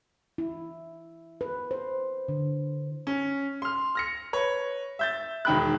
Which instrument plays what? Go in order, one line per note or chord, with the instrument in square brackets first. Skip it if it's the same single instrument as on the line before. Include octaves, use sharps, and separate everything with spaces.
[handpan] E4
B4
C5
D3
[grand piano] C#4
C6 F6
F6 A#6 C#7
B4 C#5
E5 G6 A6
E1 D#3 G5 B5 F#6